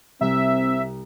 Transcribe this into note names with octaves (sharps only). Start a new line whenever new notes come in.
C2 C4 E5